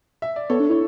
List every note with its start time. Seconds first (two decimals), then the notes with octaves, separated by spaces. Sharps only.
0.22 E5
0.36 D5
0.50 B3 A4 C#5
0.60 D4
0.70 E4 C#5